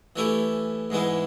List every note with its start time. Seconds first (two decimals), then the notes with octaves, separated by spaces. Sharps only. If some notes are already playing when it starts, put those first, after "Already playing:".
0.16 E3 A3 C#4 E4 G4
0.90 G#2 E3 G#3 B3 E4